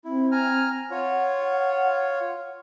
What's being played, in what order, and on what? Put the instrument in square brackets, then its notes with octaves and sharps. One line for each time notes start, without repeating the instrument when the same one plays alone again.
[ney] C4 [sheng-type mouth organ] E4
[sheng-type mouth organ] G#5 A#5 F6
[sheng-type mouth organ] F4 C#5 [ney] F#5